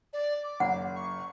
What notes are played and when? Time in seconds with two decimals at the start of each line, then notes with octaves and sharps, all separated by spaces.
0.13 D5
0.43 D6
0.60 F#1 F#5
0.96 C#6